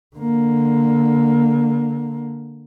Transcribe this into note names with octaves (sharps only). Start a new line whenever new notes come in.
D3 A#3